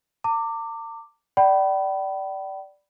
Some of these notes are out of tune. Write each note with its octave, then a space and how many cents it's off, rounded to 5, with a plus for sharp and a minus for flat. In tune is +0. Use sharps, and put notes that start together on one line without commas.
A#5 -45 D6 +0
D5 +0 G5 -40 B5 +0